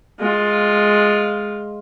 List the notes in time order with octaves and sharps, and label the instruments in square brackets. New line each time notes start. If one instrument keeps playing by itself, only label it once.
[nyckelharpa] G#3 F4